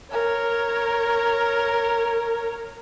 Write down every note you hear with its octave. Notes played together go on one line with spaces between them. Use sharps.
A#4 C#5